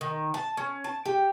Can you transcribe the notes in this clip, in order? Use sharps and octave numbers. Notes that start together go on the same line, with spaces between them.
D#3
A5
C#4
A5
G4